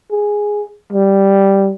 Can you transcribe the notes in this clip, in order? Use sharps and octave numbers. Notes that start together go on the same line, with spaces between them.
G#4
G3